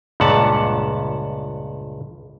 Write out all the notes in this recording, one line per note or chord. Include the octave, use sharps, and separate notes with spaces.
C#2 G2 A#2 F#5 A5